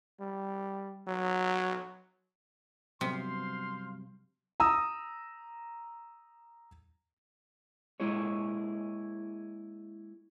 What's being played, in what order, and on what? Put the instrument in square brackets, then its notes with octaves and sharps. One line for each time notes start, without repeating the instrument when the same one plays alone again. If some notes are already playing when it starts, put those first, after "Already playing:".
[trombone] G3
F#3
[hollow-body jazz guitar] G2 F#3 B3 [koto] C3 [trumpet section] C5 F5 C6
[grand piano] A#5 D#6 E6
[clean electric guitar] G#3 A#3 E4 G#4 C#5